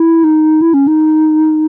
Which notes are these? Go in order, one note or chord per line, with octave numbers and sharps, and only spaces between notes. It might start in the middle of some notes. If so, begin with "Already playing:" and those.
Already playing: E4
D#4
E4
C#4
D#4